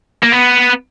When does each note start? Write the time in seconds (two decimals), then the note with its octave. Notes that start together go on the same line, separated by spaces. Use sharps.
0.24 A#3
0.33 B3